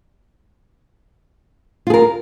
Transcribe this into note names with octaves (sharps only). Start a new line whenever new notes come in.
F4 G#4 A#4